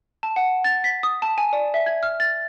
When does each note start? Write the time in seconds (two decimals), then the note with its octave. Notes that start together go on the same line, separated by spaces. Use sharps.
0.23 A5
0.36 F#5
0.64 A6
0.84 B6
1.03 D#6
1.22 A5
1.38 G#5
1.53 D5
1.74 E5
1.86 G#6
2.03 F6
2.20 A6